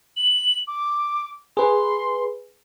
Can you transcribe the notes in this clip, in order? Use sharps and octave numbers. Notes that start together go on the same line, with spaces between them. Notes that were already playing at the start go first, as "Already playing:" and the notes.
F#7
D6
G#4 B4 C6